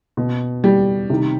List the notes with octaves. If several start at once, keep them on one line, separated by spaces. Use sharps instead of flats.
B2
G3
C3 D#3